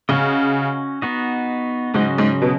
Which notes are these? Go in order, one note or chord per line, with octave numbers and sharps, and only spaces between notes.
C#3 C#4 F#4 D#5
B3 D#4 F#4 D#5
G#2 C#3 F#3 C#4 F#4 D#5
G#2
B2